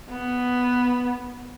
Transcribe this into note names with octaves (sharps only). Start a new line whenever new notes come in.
B3